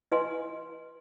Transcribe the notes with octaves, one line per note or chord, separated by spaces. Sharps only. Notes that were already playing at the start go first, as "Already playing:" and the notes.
E4 B4 D#5 F5 G#5 C6